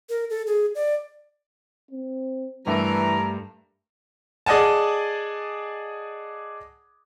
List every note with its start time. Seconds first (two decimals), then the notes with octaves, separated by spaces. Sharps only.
0.09 A#4
0.30 A4
0.47 G#4
0.75 D5
1.91 C4
2.67 G2 E3 G3 A3 A#4 A#5
4.46 G#4 D5 D#5 F#5 G#5 A5